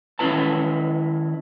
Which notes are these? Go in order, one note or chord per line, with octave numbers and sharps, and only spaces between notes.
D#3 C#4 D4 E4 B4 A5